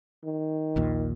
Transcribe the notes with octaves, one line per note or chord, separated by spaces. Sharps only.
D#3
A#1 D#2 A#2